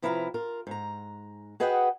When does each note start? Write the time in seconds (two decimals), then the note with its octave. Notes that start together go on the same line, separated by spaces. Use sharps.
0.02 C3 F3 E4 B4 F5 A#5
0.34 F4 A#4
0.67 G#2 A#5
1.60 F#4 G#4 B4 D#5 F#5 G5